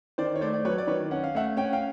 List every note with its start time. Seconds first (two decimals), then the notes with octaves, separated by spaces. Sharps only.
0.18 D#3 C5 D5
0.36 C#5
0.41 A3 C5 D5
0.54 D5
0.65 F#3 B4 C#5
0.78 D5
0.87 D#3 B4 C#5
1.11 C#4 F#5
1.24 F5
1.35 A3 E5 F#5
1.57 C#4 G5
1.65 F#5
1.73 F5 G5